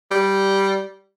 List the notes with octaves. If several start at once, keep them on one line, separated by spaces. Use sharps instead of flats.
G3